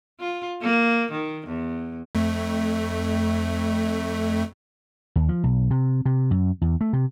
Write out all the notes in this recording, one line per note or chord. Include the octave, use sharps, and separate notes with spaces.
F4
A#3
D#3
E2
F2 A3
D#2
F3
B1
C3
C3
F#2
E2
A3
C3